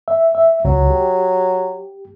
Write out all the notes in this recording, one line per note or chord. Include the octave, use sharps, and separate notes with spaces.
E5
E5
C#2 F#3
G4